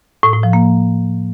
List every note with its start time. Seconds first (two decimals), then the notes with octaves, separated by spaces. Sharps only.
0.23 A2
0.33 A2
0.43 F3
0.53 A#3